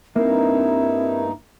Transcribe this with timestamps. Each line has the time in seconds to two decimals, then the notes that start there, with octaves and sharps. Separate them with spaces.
0.16 G2 A#3 C4 D#4 E4